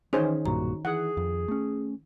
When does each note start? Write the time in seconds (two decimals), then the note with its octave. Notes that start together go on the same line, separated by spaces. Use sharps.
0.13 D#3 E3 C#4 D#4 G#4 C5
0.46 B1 G2 A#2 F#4 A#5
0.85 E3 G#4 F#5
1.17 F2
1.48 A3 C#4